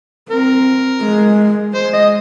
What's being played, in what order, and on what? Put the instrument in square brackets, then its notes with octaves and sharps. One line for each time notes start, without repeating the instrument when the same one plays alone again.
[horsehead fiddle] C4 [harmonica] A#4
[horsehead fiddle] G#3
[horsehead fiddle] G#3 [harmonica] C5
[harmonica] D#5